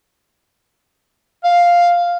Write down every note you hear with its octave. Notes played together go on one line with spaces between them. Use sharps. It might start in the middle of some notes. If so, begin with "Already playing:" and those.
F5